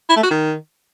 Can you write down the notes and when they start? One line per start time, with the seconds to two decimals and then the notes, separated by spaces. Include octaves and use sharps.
0.09 E4
0.16 A3
0.23 F#4
0.30 D#3